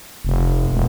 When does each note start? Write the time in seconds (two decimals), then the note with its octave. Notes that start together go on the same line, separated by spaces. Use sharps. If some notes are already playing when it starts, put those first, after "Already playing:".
0.25 F1
0.72 E1